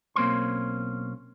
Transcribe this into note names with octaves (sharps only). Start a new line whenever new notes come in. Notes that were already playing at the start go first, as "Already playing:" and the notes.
B1 A#3 C4 C#4 C6